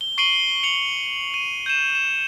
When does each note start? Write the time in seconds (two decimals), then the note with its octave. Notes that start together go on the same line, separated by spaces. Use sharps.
0.01 G7
0.18 C#6 C7 D7 D#7 F#7 G7
0.63 C#7 F7 F#7
1.34 D#7
1.66 G6 D#7 E7
1.95 E7